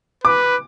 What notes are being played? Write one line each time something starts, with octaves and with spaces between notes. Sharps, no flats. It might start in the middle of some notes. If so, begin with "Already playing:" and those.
B4 D6